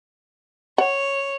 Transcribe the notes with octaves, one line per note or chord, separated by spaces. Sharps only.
C#5 F#5